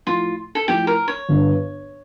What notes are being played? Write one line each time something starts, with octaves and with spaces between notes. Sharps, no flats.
A2 F3 A3 E4 F4
A4
A2 F3 A3 E4 G4
A#4
C#5
G1 G2 D3